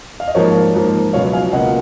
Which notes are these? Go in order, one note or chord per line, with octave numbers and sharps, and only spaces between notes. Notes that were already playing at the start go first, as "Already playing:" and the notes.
F5
D#5
G#2 F3 A#3 A#4 C#5
G#2 F3 A#3
C#2 B2 F#3 C#5 F5
F5 G#5
C#2 B2 A#3 D#5 F#5